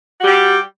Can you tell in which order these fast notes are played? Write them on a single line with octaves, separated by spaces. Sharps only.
F#4 G4 G3